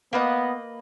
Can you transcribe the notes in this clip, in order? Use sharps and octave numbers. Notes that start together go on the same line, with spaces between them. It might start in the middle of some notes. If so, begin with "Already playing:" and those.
A#3 B3 B4 D#5